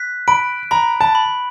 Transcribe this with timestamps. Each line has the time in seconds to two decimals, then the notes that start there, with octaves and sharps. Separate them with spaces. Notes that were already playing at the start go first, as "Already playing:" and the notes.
Already playing: F#6 B6
0.28 B5 D7
0.71 A#5 B5
1.01 A5
1.15 B5